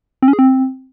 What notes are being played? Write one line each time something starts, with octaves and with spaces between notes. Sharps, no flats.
C4
C#4
G#4
C4